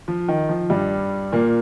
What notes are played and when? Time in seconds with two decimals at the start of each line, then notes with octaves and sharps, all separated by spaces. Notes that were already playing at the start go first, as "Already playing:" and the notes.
0.08 F3
0.28 D#3
0.49 F3
0.70 G2 G3
1.33 A#2 A#3